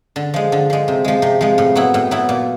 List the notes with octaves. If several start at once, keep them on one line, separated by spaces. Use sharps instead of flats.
D3
F3 G#3
D3
F3 G#3
C3
F3 G#3
C3
F3 G#3
A2
F#3 B3 E4
A2
F#3 B3 E4
A#2